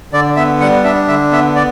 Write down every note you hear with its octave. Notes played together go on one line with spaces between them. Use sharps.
D3 D5
B3 E5
G3 F#5
D4 E5
D3 E5
B3 E5
D5